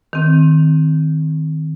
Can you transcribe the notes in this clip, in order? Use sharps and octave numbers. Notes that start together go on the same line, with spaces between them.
D#3 C4